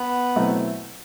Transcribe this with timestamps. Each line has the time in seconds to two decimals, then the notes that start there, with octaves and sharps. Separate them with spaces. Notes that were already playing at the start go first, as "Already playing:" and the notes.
Already playing: B3
0.36 B2 F#3 A3 C4 E4